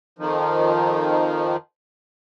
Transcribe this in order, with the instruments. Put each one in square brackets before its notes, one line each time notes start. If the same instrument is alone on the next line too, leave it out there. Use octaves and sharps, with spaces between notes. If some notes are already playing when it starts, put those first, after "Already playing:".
[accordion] F2 D#3 F3